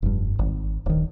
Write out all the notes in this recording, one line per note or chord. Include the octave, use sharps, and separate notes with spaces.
F1 G2
G#1
D1 D#3